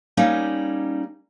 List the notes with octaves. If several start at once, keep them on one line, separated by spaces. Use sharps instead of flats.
G3 A#3 C#4 D#4